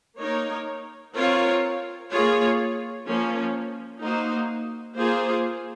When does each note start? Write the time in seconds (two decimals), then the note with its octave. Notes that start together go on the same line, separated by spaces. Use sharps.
0.19 A#3 D#4 A#4 C#5
1.15 C4 F4 A#4 C#5
2.11 A#3 F4 G#4 C#5
3.06 F3 A#3 C#4
4.02 A#3 D#4 F#4 C5
4.97 A#3 F4 G#4 C5